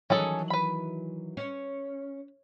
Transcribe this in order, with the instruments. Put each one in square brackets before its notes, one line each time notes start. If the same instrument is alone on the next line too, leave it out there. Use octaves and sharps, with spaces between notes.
[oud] D#3 E3 F#3 [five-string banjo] C#4 G#4 A4
[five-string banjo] B4 B5
[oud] C#4